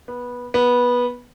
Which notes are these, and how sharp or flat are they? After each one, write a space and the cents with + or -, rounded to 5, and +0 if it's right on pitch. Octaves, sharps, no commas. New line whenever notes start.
B3 -15
B3 -15